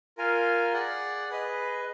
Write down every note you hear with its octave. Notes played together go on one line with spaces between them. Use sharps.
F4 A#4 F5 G#5
G#4 D5 F#5
G#4 B4 D#5